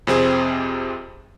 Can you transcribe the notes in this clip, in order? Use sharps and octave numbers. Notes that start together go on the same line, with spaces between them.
F2 C3 C4 G#4